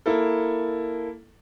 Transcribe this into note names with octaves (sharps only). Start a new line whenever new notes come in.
A#3 E4 A4